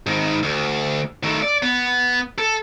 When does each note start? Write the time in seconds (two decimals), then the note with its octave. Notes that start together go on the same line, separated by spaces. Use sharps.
0.06 G#2 D#3
0.43 D2
1.23 D#3 A3
1.42 D5
1.62 B3
2.38 A4